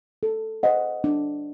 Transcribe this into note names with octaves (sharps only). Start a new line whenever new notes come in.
A4
C5 D#5 F#5
D4